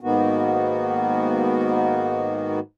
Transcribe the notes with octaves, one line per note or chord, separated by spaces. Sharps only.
G#2 D#3 A#3 B3 F#4